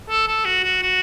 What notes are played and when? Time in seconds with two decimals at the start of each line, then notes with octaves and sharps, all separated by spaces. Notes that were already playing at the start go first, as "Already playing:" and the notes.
0.10 A4
0.28 A4
0.45 F#4
0.64 F#4
0.82 F#4